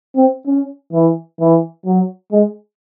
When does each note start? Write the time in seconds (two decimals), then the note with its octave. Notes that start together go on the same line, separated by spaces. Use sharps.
0.16 C4
0.47 C#4
0.93 E3
1.40 E3
1.86 F#3
2.32 G#3